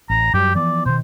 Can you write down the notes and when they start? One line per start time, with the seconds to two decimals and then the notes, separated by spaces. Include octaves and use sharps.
0.10 A1 A#5
0.34 F#2 F#3 G3 G4
0.55 E3 F3 B3 D5
0.86 B2 D#3 C5